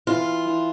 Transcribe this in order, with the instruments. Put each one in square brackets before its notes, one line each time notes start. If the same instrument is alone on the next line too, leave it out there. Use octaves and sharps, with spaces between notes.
[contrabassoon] E3 [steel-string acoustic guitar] F4
[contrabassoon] E3